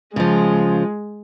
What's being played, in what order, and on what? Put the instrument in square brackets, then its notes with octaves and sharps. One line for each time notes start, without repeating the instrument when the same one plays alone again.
[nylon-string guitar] C#3 F3 [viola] G#3